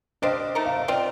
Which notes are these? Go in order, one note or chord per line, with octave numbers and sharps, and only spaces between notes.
D4 G4 C5 D#5 F5
A3 D#4 A#4
F5
D#5
F3 C4 F4 D5